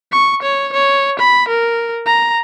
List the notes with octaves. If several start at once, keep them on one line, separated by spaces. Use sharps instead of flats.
C#6
C#5
C#5
B5
A#4
A#5